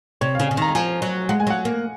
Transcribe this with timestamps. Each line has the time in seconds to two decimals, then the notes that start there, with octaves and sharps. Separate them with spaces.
0.21 C3 C#5
0.35 C#3 F5
0.48 C#3 G#5
0.57 D#3 A#5
0.69 A#5
0.75 F3 G#5
1.02 F#3
1.29 G#3 F#5
1.40 G#5
1.47 F#3 F#5
1.65 A#3